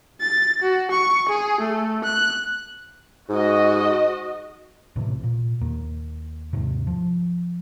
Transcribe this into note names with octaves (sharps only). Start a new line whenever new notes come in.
A6
F#4
C#6
G#4
A3
F#6
G#2 F#4 D#5
A1 A2 C3 E3
A#2
D#2 A#3
D#2 G#2 C3
F3